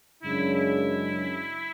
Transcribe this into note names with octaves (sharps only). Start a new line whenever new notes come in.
F#2 C#3 G#3 D4 E4
E4